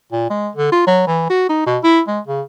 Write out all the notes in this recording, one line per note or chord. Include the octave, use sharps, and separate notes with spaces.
A#2
G#3
D3
F4
F#3
E3
F#4
D#4
B2
E4
G#3
C#3